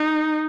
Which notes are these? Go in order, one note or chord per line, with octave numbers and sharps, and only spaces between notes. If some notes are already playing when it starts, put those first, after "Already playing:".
Already playing: D#4